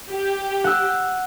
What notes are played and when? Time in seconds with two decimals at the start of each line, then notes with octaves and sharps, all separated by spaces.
0.11 G4
0.64 F#5 E6